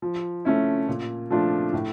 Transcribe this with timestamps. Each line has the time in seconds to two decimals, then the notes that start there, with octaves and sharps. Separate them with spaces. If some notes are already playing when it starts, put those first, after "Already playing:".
0.02 F3
0.45 A3 C#4 E4
0.88 A#2
1.30 F3 A3 D4 F4
1.73 A2